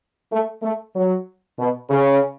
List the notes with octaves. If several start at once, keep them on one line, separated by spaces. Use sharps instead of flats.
A3
A3
F#3
B2
C#3